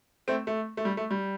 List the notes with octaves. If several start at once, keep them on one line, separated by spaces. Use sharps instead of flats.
A3 C4
A3
A3
G3
A3
G3